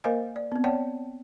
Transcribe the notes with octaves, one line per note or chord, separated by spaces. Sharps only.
A#3 A#4 C5 D#5 F5 G#5
D5
B3 C4
C#5 D5 F#5 G5 A5